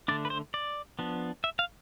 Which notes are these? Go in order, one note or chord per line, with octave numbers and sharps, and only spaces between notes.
D3 A3 D4 D5
B4
C5
D5
F3 B3 D4
E5
F5